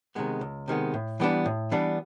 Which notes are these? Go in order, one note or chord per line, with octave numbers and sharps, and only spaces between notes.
C3 D#3 G#3 B3
C#2
C3 D#3 G#3 B3
A2
E3 G3 B3 D4
A2
E3 G3 B3 D4